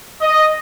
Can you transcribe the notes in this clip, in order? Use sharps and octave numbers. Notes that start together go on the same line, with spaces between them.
D#5